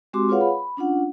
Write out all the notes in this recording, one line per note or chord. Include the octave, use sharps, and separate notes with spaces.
G#3 C4 F#4 G4 C6 D6
F4 G#4 B4 C#5 F5 F#5
B5
C#4 D4 F4 F#5